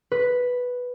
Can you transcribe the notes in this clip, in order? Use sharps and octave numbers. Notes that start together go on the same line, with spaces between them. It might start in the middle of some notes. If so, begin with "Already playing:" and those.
B4